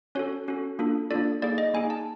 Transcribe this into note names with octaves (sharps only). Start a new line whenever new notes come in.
C#4 F#4 A4 C#5
C#4 F#4 A4
A#3 D4 F4 A4
A#3 D4 F4 A4 D5
A#3 D#4 G#4 D5
D#5
A#3 D#4 G#4 G#5
A5